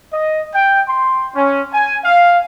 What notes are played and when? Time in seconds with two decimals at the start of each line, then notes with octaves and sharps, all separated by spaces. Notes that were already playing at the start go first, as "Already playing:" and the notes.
0.13 D#5
0.54 G5
0.88 C6
1.35 C#4
1.74 G#5
2.04 F5